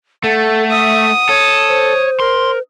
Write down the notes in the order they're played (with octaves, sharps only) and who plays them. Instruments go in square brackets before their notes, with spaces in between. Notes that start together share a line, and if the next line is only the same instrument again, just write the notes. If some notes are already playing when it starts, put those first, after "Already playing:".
[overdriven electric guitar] A3 [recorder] A4 [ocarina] F#5
[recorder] E5 [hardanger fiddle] D#6
[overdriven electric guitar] A4 [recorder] C#5
[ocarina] C5
[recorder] A#4 [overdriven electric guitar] C6